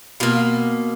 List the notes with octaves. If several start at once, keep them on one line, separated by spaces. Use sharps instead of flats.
B2 A#3 F4